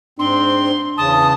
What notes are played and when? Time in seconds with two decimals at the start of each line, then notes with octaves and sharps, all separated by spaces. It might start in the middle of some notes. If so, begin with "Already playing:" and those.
0.19 G#2 C4 D4 C6
0.98 E2 C#3 A5 D#6